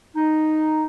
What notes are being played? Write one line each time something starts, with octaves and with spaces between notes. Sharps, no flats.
D#4